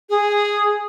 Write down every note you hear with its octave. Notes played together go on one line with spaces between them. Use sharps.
G#4